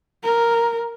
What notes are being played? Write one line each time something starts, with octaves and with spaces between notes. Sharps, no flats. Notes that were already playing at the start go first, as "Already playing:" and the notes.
A#4